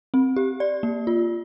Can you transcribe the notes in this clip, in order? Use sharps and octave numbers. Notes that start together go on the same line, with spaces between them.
C4
G4
D5
A#3
F4